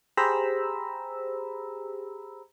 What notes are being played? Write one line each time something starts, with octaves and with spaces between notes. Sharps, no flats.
G4 G#4 C5 A#5 B5 E6